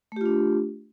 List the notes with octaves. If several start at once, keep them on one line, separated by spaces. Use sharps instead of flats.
A3 D4 F4 G4